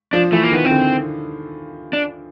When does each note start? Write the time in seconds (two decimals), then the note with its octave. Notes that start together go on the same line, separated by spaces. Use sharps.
0.13 F3 D4
0.32 E3 A3
0.43 A#3
0.52 D#3 B3
0.65 C4
0.71 D3
1.93 D4